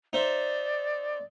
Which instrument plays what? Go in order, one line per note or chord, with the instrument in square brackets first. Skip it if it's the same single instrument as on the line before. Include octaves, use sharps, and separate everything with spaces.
[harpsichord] D#4 C5 E5 [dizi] D5